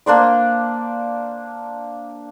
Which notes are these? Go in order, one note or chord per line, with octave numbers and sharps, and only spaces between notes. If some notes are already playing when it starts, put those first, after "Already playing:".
A#3 D4 C5 D5